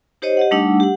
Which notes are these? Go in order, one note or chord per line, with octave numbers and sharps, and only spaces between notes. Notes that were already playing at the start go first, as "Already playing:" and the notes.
D#4 G4 C5 C#5 D#5
G4 D#5 F#5
G3 A3 D4 D#4 F#5 E6
G4 F#5